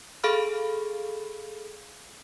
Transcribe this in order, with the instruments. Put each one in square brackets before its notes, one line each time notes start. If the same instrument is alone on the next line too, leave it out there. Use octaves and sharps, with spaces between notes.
[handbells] G#4 A4 F5 B5 F6